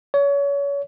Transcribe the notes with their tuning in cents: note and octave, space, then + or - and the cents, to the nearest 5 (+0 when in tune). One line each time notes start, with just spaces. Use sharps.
C#5 +30